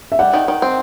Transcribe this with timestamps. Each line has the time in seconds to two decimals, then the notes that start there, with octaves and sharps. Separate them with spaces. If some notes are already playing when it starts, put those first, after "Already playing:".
0.12 E5
0.19 G3 F#5
0.34 D#3
0.48 D#3
0.62 C4